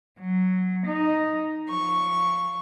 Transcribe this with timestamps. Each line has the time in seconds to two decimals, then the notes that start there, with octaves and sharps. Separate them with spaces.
0.19 F#3
0.85 D#4
1.67 F3 C#6